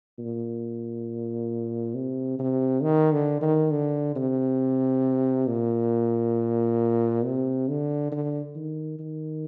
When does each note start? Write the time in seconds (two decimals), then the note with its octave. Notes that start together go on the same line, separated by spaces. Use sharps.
0.19 A#2
1.94 C3
2.39 C3
2.82 D#3
3.12 D3
3.41 D#3
3.71 D3
4.16 C3
5.47 A#2
7.24 C3
7.68 D3
8.12 D3
8.55 D#3
8.99 D#3